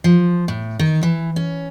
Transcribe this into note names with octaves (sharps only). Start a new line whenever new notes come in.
F3
A2
D#3
E3
C#4